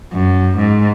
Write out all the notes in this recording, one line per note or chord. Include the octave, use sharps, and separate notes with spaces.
F#2
G#2